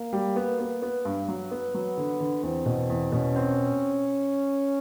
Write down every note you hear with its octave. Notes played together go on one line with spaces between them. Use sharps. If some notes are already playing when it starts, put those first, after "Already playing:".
Already playing: A#3
G3
B3
B3
B3
G2
F#3
B3
F#3 B3
D3
D3
E2 C4
B2
E2
B2 C#4
C4